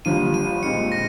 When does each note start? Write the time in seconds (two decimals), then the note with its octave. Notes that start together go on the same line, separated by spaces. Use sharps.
0.05 G1 G2 F3 A#3 F4 D#7
0.34 D#7
0.63 A#2 G#3 C4 C#7
0.92 A#6